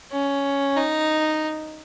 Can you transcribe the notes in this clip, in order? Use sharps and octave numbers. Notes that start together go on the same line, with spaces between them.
C#4
D#4